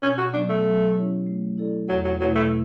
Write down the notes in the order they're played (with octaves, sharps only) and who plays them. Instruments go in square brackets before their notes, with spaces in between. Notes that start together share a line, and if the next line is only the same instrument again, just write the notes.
[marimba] B2 [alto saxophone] C#4
[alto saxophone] F#4
[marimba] F#3 B3 [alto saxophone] D4
[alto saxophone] A3
[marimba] F#3
C#4 E4 G4 C#5
A3
E4 A4 D5
[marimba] E2 [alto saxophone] F#3
[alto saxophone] F#3
[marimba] B2 A3 E4 B4 [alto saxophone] F#3
[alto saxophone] A3